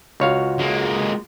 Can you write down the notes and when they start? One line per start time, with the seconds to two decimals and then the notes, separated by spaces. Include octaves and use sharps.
0.20 C#2 F4 F#4 C#5 F5
0.59 G#3 A#3